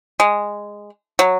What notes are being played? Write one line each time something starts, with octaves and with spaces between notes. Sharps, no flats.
G#3
F#3